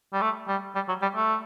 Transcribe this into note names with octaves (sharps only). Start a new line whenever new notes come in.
G3
A3
G3
G3
F#3
G3
A3